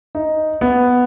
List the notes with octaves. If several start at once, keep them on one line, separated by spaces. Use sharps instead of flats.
D#4
B3